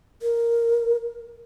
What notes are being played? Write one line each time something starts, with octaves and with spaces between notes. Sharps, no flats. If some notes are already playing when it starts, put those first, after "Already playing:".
A#4